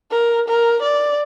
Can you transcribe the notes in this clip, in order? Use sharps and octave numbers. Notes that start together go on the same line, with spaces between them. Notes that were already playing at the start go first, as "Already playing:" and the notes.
A#4
A#4
D5